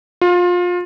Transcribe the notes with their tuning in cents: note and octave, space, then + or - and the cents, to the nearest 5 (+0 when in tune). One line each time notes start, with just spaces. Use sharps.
F4 +25